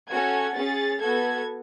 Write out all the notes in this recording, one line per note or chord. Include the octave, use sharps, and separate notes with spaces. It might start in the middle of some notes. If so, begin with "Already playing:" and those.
C#4 F#4 A4 G#6
C#4 G#4 A6
B3 F#4 A4 G#6